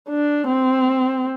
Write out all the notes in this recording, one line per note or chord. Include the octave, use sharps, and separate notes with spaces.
D4
C4